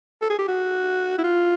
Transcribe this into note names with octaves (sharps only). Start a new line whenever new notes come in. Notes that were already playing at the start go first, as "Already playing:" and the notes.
A4
G#4
G4
F#4
E4
F4